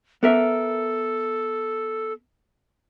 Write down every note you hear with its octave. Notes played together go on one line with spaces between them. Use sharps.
B3 A4 A#4 E5